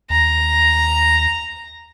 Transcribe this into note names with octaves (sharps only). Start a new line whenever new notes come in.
D#2 A#5 A#6